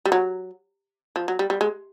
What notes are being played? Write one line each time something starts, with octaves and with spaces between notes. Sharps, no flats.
G3
F#3
F3
F#3
G3
G3
G#3